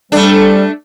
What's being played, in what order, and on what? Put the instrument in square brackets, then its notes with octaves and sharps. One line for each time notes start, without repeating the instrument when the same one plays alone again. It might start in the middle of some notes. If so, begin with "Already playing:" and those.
[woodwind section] G3 [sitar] A3 D4 [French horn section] C4 A4